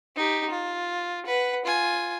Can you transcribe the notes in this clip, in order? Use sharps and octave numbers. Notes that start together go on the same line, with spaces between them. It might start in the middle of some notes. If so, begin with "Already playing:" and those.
D#4 G4
F4
B4 F#5
F4 G#5